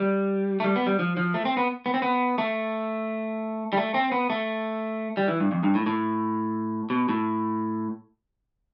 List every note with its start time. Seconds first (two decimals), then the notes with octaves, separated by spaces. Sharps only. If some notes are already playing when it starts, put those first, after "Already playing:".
Already playing: G3
0.60 A3
0.64 G3
0.76 B3
0.87 G3
0.99 F3
1.17 F3
1.34 A3
1.45 C4
1.57 B3
1.86 B3
1.94 C4
2.02 B3
2.38 A3
3.73 G3
3.77 A3
3.94 C4
4.12 B3
4.30 A3
5.17 G3
5.28 E3
5.40 G2
5.52 F2
5.63 G2
5.75 A2
5.86 A2
6.90 B2
7.09 A2